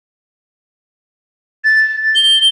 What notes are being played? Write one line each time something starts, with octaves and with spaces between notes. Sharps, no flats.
A6
G7